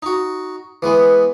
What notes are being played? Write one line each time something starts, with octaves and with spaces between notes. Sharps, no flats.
D#4 F#4
E3 G#3 B3 B4